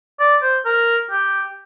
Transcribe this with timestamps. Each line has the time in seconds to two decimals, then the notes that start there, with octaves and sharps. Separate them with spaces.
0.20 D5
0.42 C5
0.65 A#4
1.11 G4